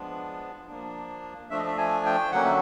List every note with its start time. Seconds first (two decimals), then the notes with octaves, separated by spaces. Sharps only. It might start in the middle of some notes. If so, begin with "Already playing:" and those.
Already playing: F3 G#3 B3 D4
0.67 F3 A#3 D4
1.50 F3 A3 D4 E5
1.59 D#5
1.67 E5
1.78 G#5
2.06 G5
2.32 D3 F#3 A#3 C#4 F#5
2.45 E5